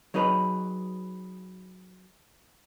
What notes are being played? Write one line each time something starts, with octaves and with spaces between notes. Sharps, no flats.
F#3 D#4 G#4 B4